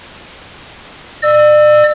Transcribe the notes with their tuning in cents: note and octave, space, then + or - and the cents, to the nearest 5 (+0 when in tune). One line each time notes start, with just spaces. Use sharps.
D5 +40 E6 +0